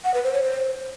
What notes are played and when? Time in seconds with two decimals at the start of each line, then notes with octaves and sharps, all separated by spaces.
0.04 F#5
0.14 B4
0.24 C5
0.33 C#5
0.43 C5